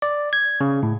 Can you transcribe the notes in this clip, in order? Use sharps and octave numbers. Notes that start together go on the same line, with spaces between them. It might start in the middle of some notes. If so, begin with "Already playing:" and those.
D5
G#6
C#3
A2